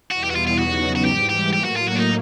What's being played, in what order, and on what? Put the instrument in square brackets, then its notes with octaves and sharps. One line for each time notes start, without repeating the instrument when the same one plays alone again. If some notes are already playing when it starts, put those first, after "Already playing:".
[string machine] E2 B2 G3 B3 E4 [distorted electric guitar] F#4
[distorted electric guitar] G4
F#4
F4
F4
[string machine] E2 C#3 F#3 B3 D#4 [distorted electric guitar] F#4
[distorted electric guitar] F#4
[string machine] G#2 E3 G3 [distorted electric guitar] G4
[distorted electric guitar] G4
[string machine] A2 F#3 A#3 [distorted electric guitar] G4
[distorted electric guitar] F#4
F4
F#4
D4
D#4